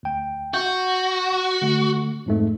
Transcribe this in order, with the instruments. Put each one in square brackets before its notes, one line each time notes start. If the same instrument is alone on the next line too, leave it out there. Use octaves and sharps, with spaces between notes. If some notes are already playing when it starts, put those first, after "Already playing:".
[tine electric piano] D2 G5
[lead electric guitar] F#4 [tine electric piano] G6
[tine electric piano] D3 A3
F2 G#2 A3